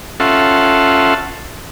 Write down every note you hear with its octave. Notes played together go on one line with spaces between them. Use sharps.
C#4 F4 A4 E5 F#5 C6